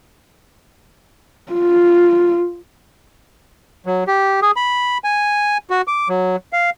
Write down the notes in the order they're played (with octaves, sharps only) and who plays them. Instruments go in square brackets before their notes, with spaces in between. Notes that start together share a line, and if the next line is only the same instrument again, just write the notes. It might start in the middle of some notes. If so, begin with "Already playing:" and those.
[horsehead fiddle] F4
[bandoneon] F#3
G4
G#4
B5
G#5
F#4
D6
F#3
F5